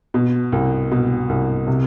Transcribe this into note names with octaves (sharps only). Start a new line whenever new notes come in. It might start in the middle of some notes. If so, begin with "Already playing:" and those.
B2
C2
B2
C2
C3